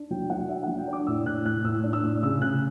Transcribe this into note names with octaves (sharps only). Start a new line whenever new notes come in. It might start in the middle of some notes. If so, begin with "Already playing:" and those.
Already playing: D4
F#3 G5
F#3 F#5
D4 E5
F#3 F#5
G5
D4
D6
A2 E6
A2 F#6
A2 F#6
A2 E6
D4
E6
A2
C#3 E6
C#3 F#6